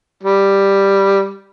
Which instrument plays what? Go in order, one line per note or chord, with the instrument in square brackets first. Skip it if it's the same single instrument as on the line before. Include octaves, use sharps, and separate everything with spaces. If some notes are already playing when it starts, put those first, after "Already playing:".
[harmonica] G3